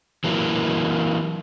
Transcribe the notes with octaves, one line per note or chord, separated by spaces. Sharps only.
E3 F#3 A#3